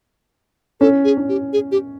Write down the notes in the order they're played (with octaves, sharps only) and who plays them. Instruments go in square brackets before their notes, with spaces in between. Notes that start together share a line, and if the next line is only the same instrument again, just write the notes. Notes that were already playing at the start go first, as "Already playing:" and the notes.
[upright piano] C#4 [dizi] A4
[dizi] G#4
[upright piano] C#4
[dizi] G4
G#4
G4